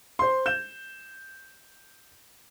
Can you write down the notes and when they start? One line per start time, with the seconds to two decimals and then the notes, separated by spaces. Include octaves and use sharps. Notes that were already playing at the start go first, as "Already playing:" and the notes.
0.19 C5 C6
0.46 G6 E7